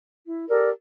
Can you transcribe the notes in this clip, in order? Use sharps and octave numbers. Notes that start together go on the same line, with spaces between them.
E4
G4 A4 A#4 D5